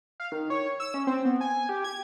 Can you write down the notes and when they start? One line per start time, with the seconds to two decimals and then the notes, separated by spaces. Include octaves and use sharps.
0.20 F5
0.32 D#3
0.50 C#5
0.80 E6
0.94 C#4
1.07 C4
1.25 B3
1.41 G#5
1.69 G4
1.84 G#6